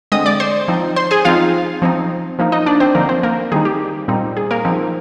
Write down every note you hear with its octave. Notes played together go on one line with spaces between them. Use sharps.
D3 G#3 C4 D#5 D#6
D5 D6
C5 C6
F3 C4 D#4
C5 C6
G#4 G#5
F3 C4 D#4 F4 F5
F3 C4 D#4
F3 A#3 D#4
D#4 D#5
D4 D5
C4 C5
D3 F3 A#3 C4 D#4 A#4
C4 C5
A#3 A#4
D#3 G3 C4 D#4 G#4
G4
A#2 G3 C4 D#4
G#4
A#3 A#4
F3 C4 D#4